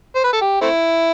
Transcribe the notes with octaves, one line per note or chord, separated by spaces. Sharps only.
C5
B4
A4
G4
A3 C4 E4